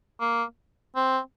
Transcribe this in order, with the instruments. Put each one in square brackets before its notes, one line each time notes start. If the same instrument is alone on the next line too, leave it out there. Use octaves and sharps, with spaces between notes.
[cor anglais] A#3
C4